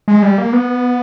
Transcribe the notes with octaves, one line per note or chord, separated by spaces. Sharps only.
G#3
G3
A#3
B3